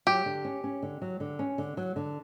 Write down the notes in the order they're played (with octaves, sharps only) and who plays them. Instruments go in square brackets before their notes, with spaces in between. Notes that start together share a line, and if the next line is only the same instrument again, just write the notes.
[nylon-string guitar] F#3 [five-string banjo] G4
[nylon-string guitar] D3
C#4
C#4
D3
F#3
D3
C#4
D3
F#3
D3